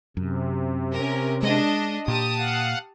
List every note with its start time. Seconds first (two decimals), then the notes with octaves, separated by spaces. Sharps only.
0.17 F#2 C3
0.93 C#4 A#4
1.43 G#3 D4 D#5
2.08 A#2 G4 A5 D#6
2.38 F5 F#5